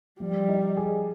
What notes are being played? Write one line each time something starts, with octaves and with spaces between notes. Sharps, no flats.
F3 G3
D#4
G#4